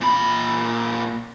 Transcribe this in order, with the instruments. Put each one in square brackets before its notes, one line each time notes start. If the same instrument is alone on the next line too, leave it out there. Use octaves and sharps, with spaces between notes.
[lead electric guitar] A#2 B5